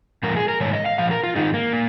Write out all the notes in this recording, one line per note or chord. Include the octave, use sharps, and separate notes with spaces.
A#2 F3 G#3 A#4
G#4
A#4
G#2 D#3 G#3 C#5
D#5
F5
A#2 F3 F5
A#4
F4
G#2 D#3 G#3 D#4
A#3
A#2